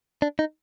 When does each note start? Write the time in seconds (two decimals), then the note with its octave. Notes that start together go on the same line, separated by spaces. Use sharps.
0.22 D4
0.39 D#4